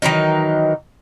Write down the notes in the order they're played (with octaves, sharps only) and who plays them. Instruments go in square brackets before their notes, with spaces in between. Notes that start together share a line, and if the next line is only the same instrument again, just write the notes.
[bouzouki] D#3 E3 F#3 D#4